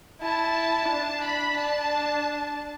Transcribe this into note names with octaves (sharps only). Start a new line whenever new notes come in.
E4 A5
D4
B5
D4 A5